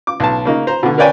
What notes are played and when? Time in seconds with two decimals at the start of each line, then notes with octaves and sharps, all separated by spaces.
0.07 D6
0.20 B1 A5
0.45 C#3 A#3 D#4
0.67 C5 A#5
0.83 B2 D3
0.98 A#4 B4 C#5 D5 G5 G#5